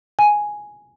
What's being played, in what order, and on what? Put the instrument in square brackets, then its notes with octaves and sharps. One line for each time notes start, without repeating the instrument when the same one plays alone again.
[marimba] G#5